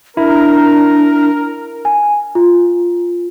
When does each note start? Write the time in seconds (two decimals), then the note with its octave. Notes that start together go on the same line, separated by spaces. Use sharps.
0.17 D4 E4 A#4
1.85 G#5
2.35 F4